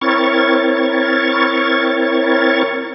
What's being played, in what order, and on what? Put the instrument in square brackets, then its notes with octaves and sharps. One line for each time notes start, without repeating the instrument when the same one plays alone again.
[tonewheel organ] C4 E4 A#4 C#5 C#6 A6